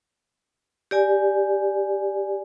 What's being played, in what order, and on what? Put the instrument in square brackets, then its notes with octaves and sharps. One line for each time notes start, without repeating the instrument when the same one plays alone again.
[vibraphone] G4 D5 G#5